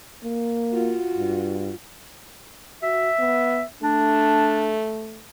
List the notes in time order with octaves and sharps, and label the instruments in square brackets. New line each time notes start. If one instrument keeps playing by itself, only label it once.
[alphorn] A#3
[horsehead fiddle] F4 F#4
[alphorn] G2
[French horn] F#4 [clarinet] E5
[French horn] B3
[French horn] A3 [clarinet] D4